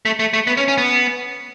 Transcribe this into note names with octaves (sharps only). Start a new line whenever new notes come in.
A3
A3
A3
B3
C#4
C#4
B3